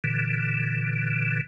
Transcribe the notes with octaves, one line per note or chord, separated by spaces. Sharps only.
A#2 D3 E3